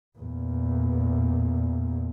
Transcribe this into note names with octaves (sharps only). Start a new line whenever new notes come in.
E2 A#2